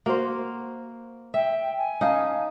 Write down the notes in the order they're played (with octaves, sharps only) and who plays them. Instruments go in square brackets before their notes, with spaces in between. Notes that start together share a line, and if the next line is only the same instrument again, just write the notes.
[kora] A#3 [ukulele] F#4 C5
[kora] E5 [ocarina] G5
[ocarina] G#5
[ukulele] C#4 F5 A5 [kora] D#4